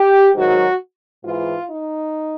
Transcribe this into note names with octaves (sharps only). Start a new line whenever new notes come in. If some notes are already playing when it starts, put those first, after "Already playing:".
Already playing: G4
G#2 D#3 F#3 F#4
G#2 E3 F4
D#4